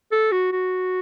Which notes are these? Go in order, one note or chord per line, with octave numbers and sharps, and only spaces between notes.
A4
F#4
F#4